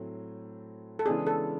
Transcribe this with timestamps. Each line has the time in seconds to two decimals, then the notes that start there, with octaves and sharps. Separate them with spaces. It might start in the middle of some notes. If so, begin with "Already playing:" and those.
Already playing: A2 F#3 A3 C4
0.99 A4
1.06 C#3 E3 G#3 B3 D4 G#4
1.27 A4